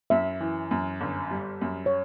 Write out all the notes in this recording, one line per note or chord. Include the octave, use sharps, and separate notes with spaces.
F#2 E5
E3
F#2
G1
G3
F#2
C#5